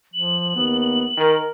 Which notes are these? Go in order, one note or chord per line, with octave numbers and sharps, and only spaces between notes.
F3 F#7
D#2 B3
D#3 A#4